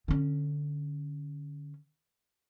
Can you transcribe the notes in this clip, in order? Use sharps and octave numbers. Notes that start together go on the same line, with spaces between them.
D3 C#4